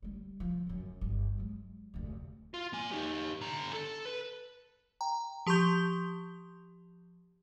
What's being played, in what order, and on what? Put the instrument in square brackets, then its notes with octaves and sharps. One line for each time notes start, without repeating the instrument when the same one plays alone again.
[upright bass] G3 A3
F3
D1 F#2
G1
F#3 G#3
F1 D2
[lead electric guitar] F4
A#3 G#5
D#4 G4
D3 A#5
A4
B4
[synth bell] G5 A#5
F3 G4 C6 C#6 G6 G7